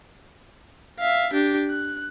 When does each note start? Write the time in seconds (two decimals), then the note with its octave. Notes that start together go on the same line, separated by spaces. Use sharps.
0.99 E5 F5
1.33 D4 G4
1.69 F#6